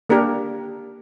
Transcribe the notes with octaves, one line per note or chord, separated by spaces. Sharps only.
A#3 D4 G4 A#4